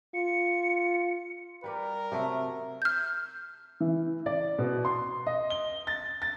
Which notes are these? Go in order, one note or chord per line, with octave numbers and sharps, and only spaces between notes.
F4 C#7
G3 A#4 B4 D5
C3 F#3 A3
F6 G6
E3
D5
B2
C6
D#5
G7
A6
A6